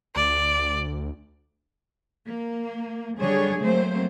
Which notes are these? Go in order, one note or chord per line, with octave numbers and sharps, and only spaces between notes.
D2 D5
A#3
D3 F#3 G3 D4 G#4 C#5
F#3 A3 A#3 C4 C5